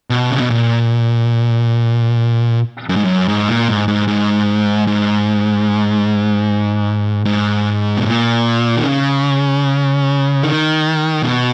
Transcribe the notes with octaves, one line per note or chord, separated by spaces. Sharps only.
B2
C#3
B2
A#2
F#2
G#2
F#2
G#2
A#2
G#2
G#2
G#2
G#2
G#2
B2
A#2
D#3
C#3
D#3
B2